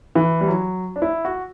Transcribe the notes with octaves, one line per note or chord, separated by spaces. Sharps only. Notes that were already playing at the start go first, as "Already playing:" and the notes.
E3
G3
F#3
D4
E4
F#4